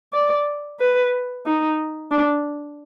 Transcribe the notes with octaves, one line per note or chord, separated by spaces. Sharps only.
D5
B4
D#4
D4